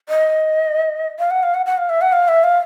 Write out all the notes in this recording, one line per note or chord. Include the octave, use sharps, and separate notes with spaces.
D#5
F5
F#5
F5
F#5
F#5
F5
E5
F#5
F5
E5
F5